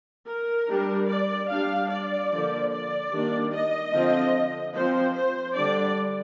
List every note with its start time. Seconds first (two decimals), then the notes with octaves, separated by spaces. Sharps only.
0.26 A#4
0.67 G3 D4
1.07 D5
1.48 G3 D4 F5
1.90 D5
2.30 D3 F3 A#3
2.70 D5
3.11 D#3 G3 A#3 D4
3.52 D#5
3.92 D3 F3 C4
4.74 F3 C4 C5
5.14 C5
5.55 D3 G3 D4 D5